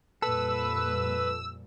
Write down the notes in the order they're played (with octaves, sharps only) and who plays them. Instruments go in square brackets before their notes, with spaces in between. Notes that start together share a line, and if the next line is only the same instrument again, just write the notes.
[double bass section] F2 A#2 G3 [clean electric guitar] A4 [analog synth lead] B4 [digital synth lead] E6